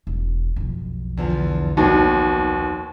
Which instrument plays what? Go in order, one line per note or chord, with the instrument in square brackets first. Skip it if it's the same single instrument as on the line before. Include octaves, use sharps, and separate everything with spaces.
[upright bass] E1
B1 F2
[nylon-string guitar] E2 D3 F3
[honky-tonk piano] D#2 [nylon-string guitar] G3 B3 F#4